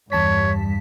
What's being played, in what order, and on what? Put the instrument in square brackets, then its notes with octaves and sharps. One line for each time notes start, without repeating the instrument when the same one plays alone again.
[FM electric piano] E2 A5 B6 [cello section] G2 [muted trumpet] C#5